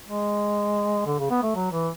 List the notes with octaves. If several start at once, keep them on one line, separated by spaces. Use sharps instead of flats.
G#3
D3
C#3
B3
A3
F#3
E3